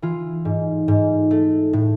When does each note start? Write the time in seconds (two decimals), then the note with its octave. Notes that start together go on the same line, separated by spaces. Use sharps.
0.02 E3 F4
0.45 G#2
0.88 G#2
1.31 A3
1.73 A2